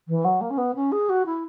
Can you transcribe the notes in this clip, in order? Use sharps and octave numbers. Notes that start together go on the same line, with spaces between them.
E3
F#3
A#3
C#4
B3
C#4
G#4
F#4
E4